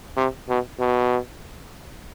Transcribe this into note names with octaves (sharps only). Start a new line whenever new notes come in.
C3
B2
B2